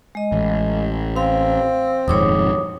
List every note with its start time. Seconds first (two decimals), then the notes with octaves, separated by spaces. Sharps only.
0.15 G#3 D#5
0.32 A1
1.16 C4 F5
2.08 D#1 F2 G#2 C#5 D6 D#6